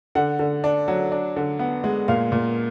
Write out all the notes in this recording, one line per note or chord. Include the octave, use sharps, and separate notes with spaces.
D3 F#5
D3
D4
F#3
D4
D3
B3
G#3
A#2 F5
A#2